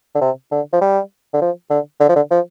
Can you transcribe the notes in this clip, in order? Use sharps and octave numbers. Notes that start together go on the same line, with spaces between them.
D3
C3
D3
F3
G3
D3
F3
D3
D3
F3
D3
F3